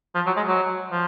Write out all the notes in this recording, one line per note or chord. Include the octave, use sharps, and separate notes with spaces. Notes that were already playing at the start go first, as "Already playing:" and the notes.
F3
F#3
G#3
F#3
F3